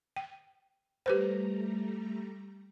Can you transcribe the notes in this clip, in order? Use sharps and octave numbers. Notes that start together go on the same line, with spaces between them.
G5
G3 A3 G4 B4 C5 A#5